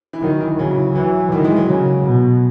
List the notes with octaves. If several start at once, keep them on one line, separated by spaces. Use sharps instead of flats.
E3
D#3 F#3
E3
C#3 F#3
E3
E3 F#3
D#3 E3
E3 G#3
F#3
C#3 F#3
B2